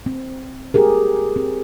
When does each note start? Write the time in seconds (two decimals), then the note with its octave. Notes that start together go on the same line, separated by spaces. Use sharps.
0.06 C4
0.74 G4 G#4 A#4
1.36 C4